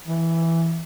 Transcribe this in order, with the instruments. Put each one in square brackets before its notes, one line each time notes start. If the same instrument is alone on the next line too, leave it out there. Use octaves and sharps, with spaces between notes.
[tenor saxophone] E3